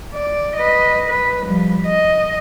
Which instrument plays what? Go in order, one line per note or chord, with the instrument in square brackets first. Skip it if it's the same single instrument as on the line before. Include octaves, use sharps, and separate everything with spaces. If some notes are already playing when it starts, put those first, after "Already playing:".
[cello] D5
B4 D#5
B4
F3 G3
D#5